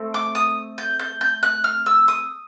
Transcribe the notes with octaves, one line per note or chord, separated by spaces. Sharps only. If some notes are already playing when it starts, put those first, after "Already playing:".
Already playing: A3 C4
D6
D#6
G6
G6
G6
F#6
F6
E6
D#6